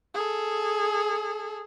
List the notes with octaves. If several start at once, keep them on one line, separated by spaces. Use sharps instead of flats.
G#4 A4